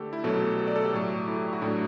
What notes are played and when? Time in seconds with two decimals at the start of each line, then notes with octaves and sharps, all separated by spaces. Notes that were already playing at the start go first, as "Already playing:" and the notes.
Already playing: D3 A3 G4 A4
0.13 E4
0.24 B2 F#3 A3 A4
0.42 G4
0.58 A4
0.67 D5
0.76 A4
0.84 G4
0.94 A2 F#3 A3
1.28 E4
1.36 G4
1.53 F#4
1.61 A2 F#3 A3 D4